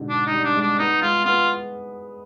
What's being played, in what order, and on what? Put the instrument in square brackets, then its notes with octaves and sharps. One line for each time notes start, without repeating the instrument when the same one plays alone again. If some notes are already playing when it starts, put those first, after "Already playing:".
Already playing: [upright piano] G#2 B2 D3
[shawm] D4
D#4
[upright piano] G3
[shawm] D4
[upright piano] G#3
[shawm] D4
[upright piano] B3 [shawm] D#4
[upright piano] G#3 [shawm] F4
[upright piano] B3 [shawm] F4